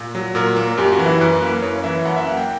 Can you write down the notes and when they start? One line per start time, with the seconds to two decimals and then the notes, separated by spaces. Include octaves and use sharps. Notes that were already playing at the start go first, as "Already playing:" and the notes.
Already playing: A#2
0.15 F#3
0.35 A#2 A#4
0.56 A#3
0.78 F#2 G4
0.92 F#4
0.99 E3
1.06 E4
1.21 F#2 B4
1.42 A#3
1.62 F#2 C#5
1.84 E3 E5
2.05 F#2 F#5
2.16 E5
2.26 A#3 F#5
2.37 G5